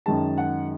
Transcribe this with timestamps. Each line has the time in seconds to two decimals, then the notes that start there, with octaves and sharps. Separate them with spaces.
0.06 F#2 D#3 G#3 A5
0.38 F#5